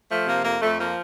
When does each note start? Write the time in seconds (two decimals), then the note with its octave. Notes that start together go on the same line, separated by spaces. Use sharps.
0.09 F3 A3
0.26 C3 A#3
0.43 F2 A#3
0.61 F2 A3
0.78 F3 A#3